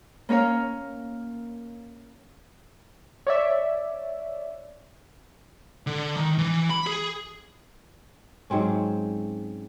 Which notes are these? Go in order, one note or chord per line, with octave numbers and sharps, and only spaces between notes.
A#3 C#4 A#4 C#5 F5
C#5 D5 E5
D3
D#3
E3
B5
G#4
G#2 F#3 C4 C#4